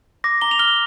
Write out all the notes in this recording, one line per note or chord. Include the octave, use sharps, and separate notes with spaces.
D6 A#6
A#5 G7
F7
F6 G7